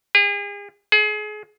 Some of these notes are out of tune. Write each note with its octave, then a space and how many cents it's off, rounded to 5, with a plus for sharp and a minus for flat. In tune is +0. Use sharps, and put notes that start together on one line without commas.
G#4 -40
G#4 +30